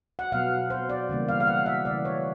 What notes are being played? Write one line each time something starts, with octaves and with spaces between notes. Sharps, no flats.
F#5
B2 F#3 B3 F5
C5
D5
C#3 E3 G3 A#3
F5
F5
F#5
E5
C#3 E3 A3 D5
C#5